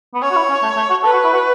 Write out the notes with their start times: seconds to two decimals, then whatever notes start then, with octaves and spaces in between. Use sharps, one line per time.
0.14 B3
0.22 C#4 C#5
0.31 F#4
0.36 E4
0.50 C#4
0.63 A3
0.77 A3
0.90 F#4
1.03 A4 B4
1.13 F#4
1.24 E4
1.33 F#4